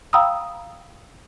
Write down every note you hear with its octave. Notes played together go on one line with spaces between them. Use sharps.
F5 G5 A#5 B5 D#6 E6